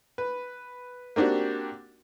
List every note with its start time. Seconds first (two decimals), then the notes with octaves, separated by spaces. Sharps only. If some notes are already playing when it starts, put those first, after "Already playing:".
0.18 B4
1.16 A#3 C4 D4 F#4 G4